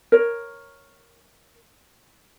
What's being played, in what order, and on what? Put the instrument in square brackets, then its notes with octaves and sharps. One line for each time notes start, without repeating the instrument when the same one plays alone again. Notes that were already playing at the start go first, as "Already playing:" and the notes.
[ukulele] A#4 C#5